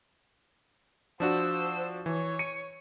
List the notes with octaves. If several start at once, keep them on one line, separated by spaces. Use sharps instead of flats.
F3 D4 F#4 C5 E6
E3 C#5
C#7 D#7